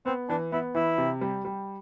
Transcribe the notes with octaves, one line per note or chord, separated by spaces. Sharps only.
B3 C4
E3 D4
B3 E4
E3 E4
C3
G3
G3